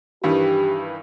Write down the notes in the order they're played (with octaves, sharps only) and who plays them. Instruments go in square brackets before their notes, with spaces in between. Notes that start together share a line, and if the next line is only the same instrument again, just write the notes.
[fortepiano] G2 D#3 E3 [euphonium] G4